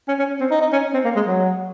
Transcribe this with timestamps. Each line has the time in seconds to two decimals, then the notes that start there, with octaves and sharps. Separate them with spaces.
0.08 C#4
0.19 C#4
0.40 C4
0.51 D#4
0.61 D#4
0.72 C#4
0.94 C4
1.05 A#3
1.16 G#3
1.27 F#3